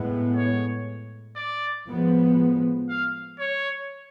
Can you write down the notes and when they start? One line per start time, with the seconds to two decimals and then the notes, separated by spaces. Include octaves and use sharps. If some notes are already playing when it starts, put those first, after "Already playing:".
Already playing: A2 G#3 B3
0.35 C#5
1.36 D5
1.87 A2 F3 G#3 B3
2.89 F5
3.39 C#5